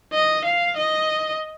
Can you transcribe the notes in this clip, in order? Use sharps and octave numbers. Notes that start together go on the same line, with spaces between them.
D#5
F5
D#5